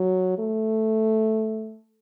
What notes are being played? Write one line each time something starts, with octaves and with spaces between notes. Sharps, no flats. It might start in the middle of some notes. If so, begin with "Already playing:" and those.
Already playing: F#3
A3